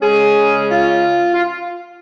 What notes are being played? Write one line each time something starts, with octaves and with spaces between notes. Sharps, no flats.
C#3 G#3 C#4 G#4
F4
F4